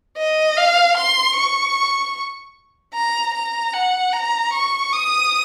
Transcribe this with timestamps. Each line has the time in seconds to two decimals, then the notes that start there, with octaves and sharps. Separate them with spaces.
0.18 D#5
0.57 F5
0.98 C6
1.36 C#6
2.94 A#5
3.34 A#5
3.73 F#5
4.13 A#5
4.54 C#6
4.93 D#6